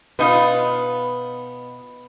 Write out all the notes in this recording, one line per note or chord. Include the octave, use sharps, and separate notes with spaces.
B2 B3 D#4 F4